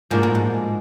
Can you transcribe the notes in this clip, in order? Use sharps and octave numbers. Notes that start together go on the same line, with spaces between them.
G#2 F3 A#3 D4 F#4
A2
G#2